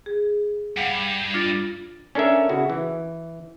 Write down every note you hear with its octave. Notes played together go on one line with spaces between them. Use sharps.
G#4
G2 F5 F#5
D4 F4 A6
C#4 D4 A4 A#4 E5
C#3 E4 F#4
E3